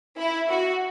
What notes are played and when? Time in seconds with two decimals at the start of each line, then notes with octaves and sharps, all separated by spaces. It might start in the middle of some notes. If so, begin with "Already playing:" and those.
0.18 E4
0.50 F#4